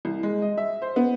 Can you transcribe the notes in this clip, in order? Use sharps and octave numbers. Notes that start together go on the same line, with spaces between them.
C2
G#3
D#5
E5
C5
B3